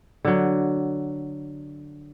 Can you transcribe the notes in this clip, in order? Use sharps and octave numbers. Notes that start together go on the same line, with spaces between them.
D3 F#3